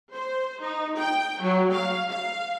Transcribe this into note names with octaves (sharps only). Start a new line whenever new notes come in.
C5
D#4
G5
F#3
F5
F5